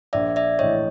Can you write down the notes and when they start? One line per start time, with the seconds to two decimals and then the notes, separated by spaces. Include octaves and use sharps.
0.13 A#1 D5 E5
0.36 D5 E5
0.59 A2 E3 C#5 D#5